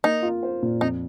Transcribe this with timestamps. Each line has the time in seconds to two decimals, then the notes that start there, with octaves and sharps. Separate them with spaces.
0.04 A#3 D#4
0.22 F4
0.43 C5
0.62 A#2
0.81 F2 D#4